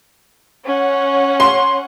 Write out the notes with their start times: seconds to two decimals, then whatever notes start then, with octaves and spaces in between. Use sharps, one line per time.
0.66 C#4 F#5
1.40 C6